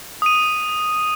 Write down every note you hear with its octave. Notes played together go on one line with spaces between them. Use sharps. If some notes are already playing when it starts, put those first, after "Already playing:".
D#6 D#7